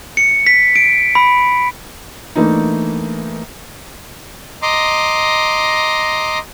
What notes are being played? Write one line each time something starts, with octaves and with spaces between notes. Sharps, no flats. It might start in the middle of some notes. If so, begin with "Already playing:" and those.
C#7
B6
D7
B5
E3 A3 A#3 D4 D#4
D#5 A#5 C6 D6